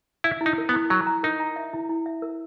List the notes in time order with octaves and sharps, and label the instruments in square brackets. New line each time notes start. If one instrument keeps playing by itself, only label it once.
[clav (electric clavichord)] E4 [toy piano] E5
[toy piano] E4
[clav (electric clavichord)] D#4
[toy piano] A#4
[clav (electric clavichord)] B3
[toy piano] E4
[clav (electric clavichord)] F#3 [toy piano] A#5
[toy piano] A#5
[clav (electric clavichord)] D#4 [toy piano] A#4
[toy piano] A#5
E5
E4
E4
E5
A#4